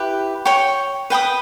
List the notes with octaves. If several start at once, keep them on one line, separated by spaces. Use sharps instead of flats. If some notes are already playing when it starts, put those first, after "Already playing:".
Already playing: E4 G4 B4
C#5 G5 C#6
B4 G5 B5 D#6